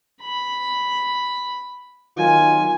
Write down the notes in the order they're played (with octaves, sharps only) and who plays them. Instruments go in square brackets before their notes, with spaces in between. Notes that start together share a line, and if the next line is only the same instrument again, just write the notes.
[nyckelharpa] B5
[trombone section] D#3 F#3 F4 [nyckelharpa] G#5